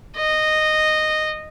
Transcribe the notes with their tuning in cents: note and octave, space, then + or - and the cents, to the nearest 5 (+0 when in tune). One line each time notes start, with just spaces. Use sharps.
D#5 -10